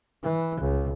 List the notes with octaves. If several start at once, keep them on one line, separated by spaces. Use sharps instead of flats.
E3
C#2